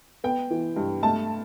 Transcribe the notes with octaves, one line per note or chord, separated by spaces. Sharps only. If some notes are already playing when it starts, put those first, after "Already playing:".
B3 G5
E3
G2
A3 A5